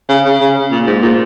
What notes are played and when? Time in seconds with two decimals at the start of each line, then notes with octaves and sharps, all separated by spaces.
0.09 C#3
0.25 C#3
0.41 C#3
0.71 A#2
0.87 G#2
1.02 A#2